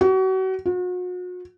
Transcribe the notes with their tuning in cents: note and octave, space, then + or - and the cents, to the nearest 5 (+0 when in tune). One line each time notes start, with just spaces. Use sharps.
F#4 +35
F#4 -40